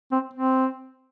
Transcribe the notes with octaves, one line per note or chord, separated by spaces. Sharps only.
C4
C4